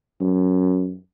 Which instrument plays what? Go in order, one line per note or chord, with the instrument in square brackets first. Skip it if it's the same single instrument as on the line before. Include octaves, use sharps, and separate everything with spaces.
[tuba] F#2